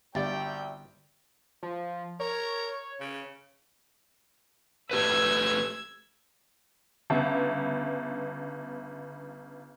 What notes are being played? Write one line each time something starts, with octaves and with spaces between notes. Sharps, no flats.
G1 C2 F#3 G3 G4 D5 E5 G5
F3
A#4 C#5
C#3
A3 G4 B4 E6 G#6
G1 C#3 B3 E5 F#5